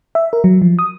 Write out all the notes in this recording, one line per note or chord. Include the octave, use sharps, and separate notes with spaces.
E5
A#4
F#3
F3
D#6